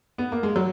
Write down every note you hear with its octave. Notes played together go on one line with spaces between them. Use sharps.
B3
A#3
G#3
F#3